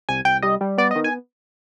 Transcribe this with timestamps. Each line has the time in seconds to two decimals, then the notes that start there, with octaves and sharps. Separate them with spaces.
0.09 C2 G#5
0.25 C2 G5
0.42 G3 D#5
0.61 G3
0.78 B3 D5
0.91 D#5
0.96 D#3
1.04 G#5